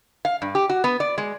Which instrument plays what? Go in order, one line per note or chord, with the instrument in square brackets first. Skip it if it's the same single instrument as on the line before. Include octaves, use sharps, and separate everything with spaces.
[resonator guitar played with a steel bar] F5
G2
G4
F#4
B3
D5
G#3